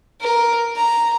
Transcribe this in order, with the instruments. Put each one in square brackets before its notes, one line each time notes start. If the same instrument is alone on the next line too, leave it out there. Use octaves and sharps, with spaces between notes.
[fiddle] A#4
A#5